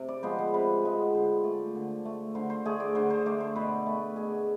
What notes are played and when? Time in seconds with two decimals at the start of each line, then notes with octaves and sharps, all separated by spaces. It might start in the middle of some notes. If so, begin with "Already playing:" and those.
Already playing: C3
0.09 D5
0.23 F3 G#3 B3 C5
0.39 C5
0.53 C3 B4
0.83 F3 G#3 B3
1.14 D3 C5
1.44 A3 D5
1.75 D3
2.05 A3
2.35 D3 C5
2.50 C5
2.65 A3 G#4
2.80 D5
2.95 D3 C5
3.10 C5
3.26 A3 D5
3.40 C5
3.56 B2 B4
3.86 A3
4.16 B2 G#4